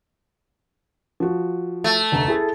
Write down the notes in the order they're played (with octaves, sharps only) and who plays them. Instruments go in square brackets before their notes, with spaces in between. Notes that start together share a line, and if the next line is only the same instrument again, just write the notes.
[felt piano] F3 F#4
[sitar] A3
[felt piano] F1 D2 A#5
E4 G#4 A4